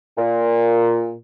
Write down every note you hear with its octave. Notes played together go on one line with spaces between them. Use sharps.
A#2